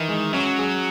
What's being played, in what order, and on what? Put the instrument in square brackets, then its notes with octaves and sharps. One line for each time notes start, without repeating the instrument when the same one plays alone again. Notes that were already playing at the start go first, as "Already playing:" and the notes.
Already playing: [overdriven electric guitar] D#3 [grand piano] E3
[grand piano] G#3
[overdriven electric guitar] F#3 [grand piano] C#4
[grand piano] G#4